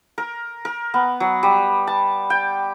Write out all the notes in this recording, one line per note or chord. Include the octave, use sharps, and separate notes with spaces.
A#4
A#4
B3
F#3
G3
A5
G5